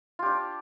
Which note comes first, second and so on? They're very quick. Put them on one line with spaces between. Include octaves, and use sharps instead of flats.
F4 G4 D4